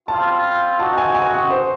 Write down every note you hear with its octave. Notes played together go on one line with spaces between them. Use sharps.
G3 C4 F4 A5
C4 D#4 F#4 A5
G#5
G#5
F#5
C5